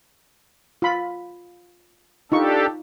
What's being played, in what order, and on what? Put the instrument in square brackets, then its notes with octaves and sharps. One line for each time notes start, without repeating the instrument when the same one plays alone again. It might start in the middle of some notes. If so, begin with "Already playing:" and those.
[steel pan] F4 B5
[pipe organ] D4 G4 A4 [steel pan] D#4 F4 C#6